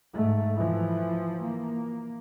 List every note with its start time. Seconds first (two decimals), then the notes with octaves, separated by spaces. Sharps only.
0.13 G#2 A3
0.56 E3 F3
1.43 A#3